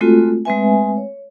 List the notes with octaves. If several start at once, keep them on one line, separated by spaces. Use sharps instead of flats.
G#3 A3 C4 F4 F#4 A4
G#3 A3 C4 B4 E5 G#5
C#5